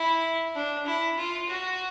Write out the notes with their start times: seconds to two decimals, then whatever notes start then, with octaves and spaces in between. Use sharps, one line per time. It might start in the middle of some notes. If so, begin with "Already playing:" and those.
Already playing: E4
0.55 D4
0.86 E4
1.17 F4
1.48 F#4